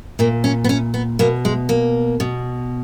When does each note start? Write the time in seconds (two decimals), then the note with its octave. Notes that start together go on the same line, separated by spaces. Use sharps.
0.19 A#2 A#3
0.44 C#4
0.64 B3
0.69 C#4
0.94 B3
1.19 B2 A#3
1.45 G#3
1.69 A#3
2.20 B2